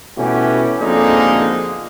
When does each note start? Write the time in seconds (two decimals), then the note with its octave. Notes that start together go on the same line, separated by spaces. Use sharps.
0.17 B2 E3 A3 C#4 F#4 G4
0.79 F2 B2 D3 G#3 A#3 D#4